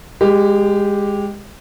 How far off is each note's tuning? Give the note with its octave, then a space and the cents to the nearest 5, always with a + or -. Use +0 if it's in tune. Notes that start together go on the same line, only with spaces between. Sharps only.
G#3 -20 G4 +0